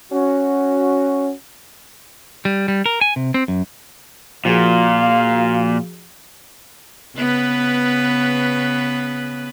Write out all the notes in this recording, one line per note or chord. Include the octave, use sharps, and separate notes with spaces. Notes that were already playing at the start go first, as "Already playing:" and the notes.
C#4 F#4
G3
G3
A#4
G#5
C3
C4
F#2
A#2 F3 F#4 G#4 F5
C#3 B3 B4